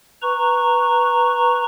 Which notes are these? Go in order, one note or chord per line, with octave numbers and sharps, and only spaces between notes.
B4 A#5 C#6